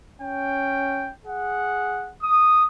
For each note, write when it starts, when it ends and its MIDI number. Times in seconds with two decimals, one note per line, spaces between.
0.21 1.11 61
0.21 1.11 79
1.25 2.13 68
1.25 2.13 78
2.22 2.65 87